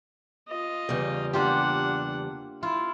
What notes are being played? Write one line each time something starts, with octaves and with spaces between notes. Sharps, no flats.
F4 D#5
E2 C#3 G3
A#3 D4 F4 G4 F#5
E4 F4